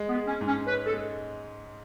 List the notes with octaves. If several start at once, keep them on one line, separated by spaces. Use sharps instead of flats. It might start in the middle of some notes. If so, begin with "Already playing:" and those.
Already playing: G#3
B3
G#4
C#4
G#2
C#4
C#4 B4
A4
G#3